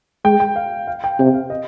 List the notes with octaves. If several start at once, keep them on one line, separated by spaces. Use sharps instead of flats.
G#3 G5
G5
F5
F5
G5
C3 G5
F5
D#5